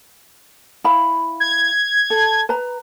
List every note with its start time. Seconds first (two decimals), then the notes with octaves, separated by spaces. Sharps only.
0.84 E4 F5 B5
1.40 G#6
2.10 A4
2.49 B4 A#5